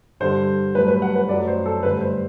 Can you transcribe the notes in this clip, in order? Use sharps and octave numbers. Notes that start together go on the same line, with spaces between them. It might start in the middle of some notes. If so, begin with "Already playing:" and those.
G2 D3 G3 C5
G2 F#3 A3 B4
B4
F#5
B4
F#2 F#3 A3 D5
C5
A4
G2 D3 A3 B4
C5